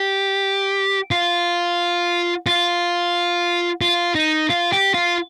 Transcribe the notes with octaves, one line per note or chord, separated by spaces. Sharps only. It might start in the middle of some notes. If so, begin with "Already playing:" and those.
Already playing: G4
F4
F4
F4
D#4
F4
G4
F4